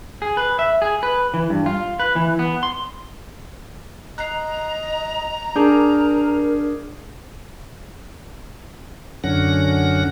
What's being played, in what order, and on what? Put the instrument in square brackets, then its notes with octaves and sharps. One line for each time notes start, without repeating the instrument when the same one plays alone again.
[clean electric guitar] G#4
B4
E5
G#4
B4
E3
G2
F4
B4
E3
B3
C6
[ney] D#5 [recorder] A#5 [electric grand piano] F#6 C7
[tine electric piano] D4 [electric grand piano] G#4 D6 G6 [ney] A#4
[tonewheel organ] F#2 D3 C#4 F#5 A#6